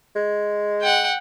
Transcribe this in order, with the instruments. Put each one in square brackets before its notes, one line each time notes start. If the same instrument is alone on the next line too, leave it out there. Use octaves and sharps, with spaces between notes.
[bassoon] G#3
[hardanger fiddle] F#5 G5